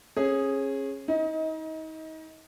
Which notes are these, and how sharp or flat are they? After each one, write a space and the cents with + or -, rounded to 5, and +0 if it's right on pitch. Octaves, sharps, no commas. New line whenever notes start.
C#4 -30 G#4 -5
D#4 +35 D#5 +25